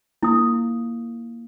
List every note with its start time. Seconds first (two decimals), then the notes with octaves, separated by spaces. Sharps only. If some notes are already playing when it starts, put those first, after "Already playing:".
0.23 A#3 E4 D#6